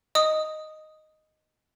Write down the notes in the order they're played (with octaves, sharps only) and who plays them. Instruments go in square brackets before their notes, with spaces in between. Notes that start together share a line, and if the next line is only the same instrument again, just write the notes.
[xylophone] D#5 D#6